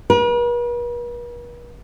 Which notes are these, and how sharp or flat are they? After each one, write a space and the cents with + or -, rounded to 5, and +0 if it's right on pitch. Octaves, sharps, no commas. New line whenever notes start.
B4 -45